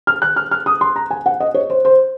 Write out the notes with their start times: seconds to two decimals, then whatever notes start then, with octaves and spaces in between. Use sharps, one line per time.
0.07 F6
0.22 F#6
0.36 F6
0.51 F6
0.66 D#6
0.81 C6
0.96 A#5
1.11 G#5
1.26 F#5
1.40 D#5
1.54 C#5
1.70 C5
1.85 C5